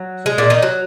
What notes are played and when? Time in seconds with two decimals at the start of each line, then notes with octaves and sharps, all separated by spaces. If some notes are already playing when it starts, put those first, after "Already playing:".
Already playing: F#3
0.26 G#3
0.38 A#2 A#3
0.50 D#3 D#4
0.62 F#3